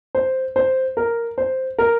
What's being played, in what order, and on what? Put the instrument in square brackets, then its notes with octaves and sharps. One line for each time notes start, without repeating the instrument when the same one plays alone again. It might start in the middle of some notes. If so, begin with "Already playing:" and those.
[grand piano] C5
C5
A#4
C5
A#4